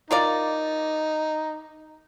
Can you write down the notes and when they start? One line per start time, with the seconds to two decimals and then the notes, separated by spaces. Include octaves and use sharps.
0.11 D#4 F4 A#4 D5